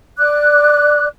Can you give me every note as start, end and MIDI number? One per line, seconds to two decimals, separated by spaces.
0.18 1.07 74
0.18 1.07 86
0.18 1.07 90